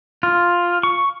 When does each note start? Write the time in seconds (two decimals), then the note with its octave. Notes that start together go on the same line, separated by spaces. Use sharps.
0.23 F4
0.83 C#6